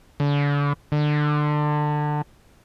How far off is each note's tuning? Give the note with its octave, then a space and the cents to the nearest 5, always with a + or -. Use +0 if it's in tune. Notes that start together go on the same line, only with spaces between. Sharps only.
D3 -35
D3 +25